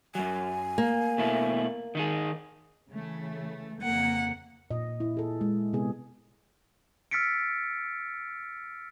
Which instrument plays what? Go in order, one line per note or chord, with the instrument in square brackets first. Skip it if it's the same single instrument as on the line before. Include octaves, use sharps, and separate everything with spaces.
[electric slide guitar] F#2 F#3 [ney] G#5
[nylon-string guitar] A#3
[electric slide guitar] B2 A3 E4
D#3 D#4 G#4
[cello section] C#3 E3 A3
[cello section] F2 C#3 A#3 [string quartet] F#5
[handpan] A#2 D#5
E4
G#4 A4
G#3
C3 B3 G#4
[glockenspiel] E6 F6 A6 B6 C#7 D7